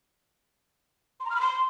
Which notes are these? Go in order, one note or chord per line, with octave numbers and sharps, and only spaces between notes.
C6
A#5
F6
B5
C6